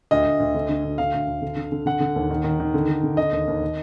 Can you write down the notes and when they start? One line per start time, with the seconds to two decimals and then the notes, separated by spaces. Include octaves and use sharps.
0.11 D2 D#5
0.26 D2
0.40 D2
0.55 D3
0.69 D3
0.85 D2
0.98 D3 F5
1.14 D2
1.27 D2
1.42 D3
1.56 D3
1.72 D3
1.86 D3 F#5
2.00 D3
2.16 D#2
2.31 D#3
2.44 D#3
2.60 D#3
2.74 D3
2.88 D3
3.03 D3
3.17 D3 D#5
3.32 D#2
3.47 D#2
3.61 D#3